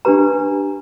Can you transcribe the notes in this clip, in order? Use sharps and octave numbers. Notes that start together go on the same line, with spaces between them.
D4 G4 B4 A#5